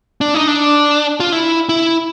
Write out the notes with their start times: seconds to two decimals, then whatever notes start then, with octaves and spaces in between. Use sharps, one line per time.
0.21 D4
0.34 D#4
0.48 D4
1.20 F4
1.32 E4
1.69 E4